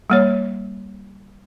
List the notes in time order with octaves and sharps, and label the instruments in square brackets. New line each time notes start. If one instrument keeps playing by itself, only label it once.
[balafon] G3 A#3 C#5